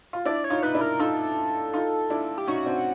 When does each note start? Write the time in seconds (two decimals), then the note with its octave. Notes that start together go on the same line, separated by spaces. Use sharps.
0.13 F4
0.25 D4 E4 D5
0.44 C#5
0.50 D#4 F4
0.63 D#4 B4
0.75 D4 E4
0.81 A#4
0.99 D#4 F4 A4
1.73 D#4 F4
2.10 D4 E4
2.38 G4
2.47 C#4 D#4 F#4
2.66 C4 D4